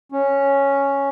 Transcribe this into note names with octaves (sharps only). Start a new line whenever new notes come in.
C#4